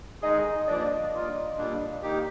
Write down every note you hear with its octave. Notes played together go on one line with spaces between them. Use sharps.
D#3 G#3 D#4 G#4 D#5
G2 F3 A#3 D4 D5
G2 D#3 A#3 F4 A#4
A#2 G3 A#3 D4
D#3 A#3 D#4 G4